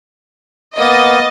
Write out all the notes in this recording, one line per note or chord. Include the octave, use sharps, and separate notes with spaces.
A#3 B3 D#5 A6